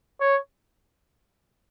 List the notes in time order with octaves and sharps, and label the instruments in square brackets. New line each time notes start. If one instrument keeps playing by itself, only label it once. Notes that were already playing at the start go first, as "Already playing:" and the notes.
[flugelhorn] C#5